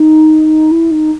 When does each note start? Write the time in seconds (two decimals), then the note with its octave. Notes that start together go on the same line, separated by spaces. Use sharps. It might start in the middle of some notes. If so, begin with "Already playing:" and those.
Already playing: D#4
0.71 E4
0.91 D#4